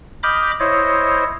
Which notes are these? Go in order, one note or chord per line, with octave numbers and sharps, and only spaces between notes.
D#5 B5 D6 F6 G6
E4 C5 C#5 D#5